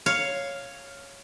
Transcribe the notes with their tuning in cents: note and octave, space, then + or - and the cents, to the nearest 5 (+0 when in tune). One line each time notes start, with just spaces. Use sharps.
C#5 +0 F5 +0